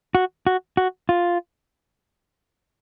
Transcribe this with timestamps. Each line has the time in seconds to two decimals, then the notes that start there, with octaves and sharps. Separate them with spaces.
0.15 F#4
0.47 F#4
0.77 F#4
1.09 F4